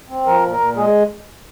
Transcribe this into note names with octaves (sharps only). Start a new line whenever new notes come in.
C4
F3 A#4
A#2
A#4
A#2
G#3 G#4